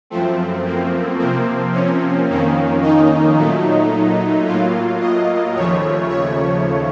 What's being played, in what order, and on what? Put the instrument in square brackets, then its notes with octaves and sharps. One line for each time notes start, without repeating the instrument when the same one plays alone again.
[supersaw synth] F#2 F3 A3 C4
A#3
C3 F3 A#3 C4
C#4
F2 D#3 A#3
D#4
A#2 F#3 A3
A2 F#3 A#3 F4
D#5
D#2 C#3 F3 A3 C#5
C#5